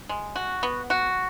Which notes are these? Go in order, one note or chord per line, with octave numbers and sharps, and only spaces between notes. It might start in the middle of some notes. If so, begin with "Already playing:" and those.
G#3
F#4
B3
F#4